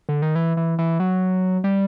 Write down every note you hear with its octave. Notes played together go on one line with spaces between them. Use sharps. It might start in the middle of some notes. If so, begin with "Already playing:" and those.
D3
D#3
E3
E3
E3
F#3
G3